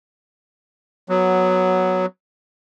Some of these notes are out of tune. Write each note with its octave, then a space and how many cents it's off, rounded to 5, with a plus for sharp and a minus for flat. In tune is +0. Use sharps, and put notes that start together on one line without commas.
F#3 +0 B3 +0